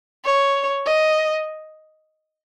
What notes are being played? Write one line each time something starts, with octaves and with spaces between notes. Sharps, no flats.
C#5
D#5